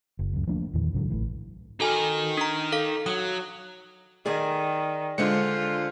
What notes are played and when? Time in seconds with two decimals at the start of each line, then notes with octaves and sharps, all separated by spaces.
0.19 F#1
0.33 C#2 F#2
0.47 F3 A3 A#3 D4
0.73 E2 A#2 D#3 E3
0.93 C2 G#2 D3 F#3
1.10 A1 A2 E3
1.80 D#4 F#4 A4 A#4 G#5
2.37 D4 A#5
2.72 A4 F5 B6
3.06 F#3 D#6
4.26 D#3 G#4 D5 G#5
5.18 D3 G#3 D4 F4 C5 C#7